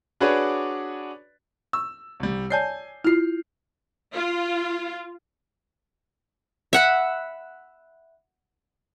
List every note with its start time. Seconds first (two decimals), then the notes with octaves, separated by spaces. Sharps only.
0.20 D4 F#4 G#4 B4 C#5 D5
1.73 C#6 E6
2.20 C2 G3
2.50 C#5 D5 G#5 A5 G6 C7
3.04 E4 F4 F6 C7
4.14 F4
6.73 E5 F#5 B5